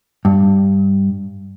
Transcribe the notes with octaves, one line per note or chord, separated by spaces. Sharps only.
G2